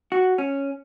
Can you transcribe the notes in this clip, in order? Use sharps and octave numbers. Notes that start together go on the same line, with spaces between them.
F#4
C#4